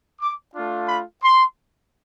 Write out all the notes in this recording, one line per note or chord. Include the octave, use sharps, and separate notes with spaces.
D6
A3 D4 F4
B5
C6